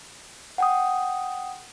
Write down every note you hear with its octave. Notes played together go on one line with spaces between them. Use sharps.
F#5 G5 D#6